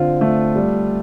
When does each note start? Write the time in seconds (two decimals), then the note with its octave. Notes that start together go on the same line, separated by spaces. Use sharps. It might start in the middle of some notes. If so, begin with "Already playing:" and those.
Already playing: D3 C4 F4
0.21 A3
0.56 G3